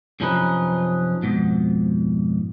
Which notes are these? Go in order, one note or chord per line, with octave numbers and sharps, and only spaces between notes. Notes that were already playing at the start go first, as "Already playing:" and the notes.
F#2 C3 F3 C#4 D#4 B4
F2 G#2 B2